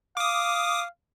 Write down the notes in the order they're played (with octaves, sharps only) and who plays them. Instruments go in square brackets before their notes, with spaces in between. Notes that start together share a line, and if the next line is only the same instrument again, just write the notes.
[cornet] F5 [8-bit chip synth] D6 D#6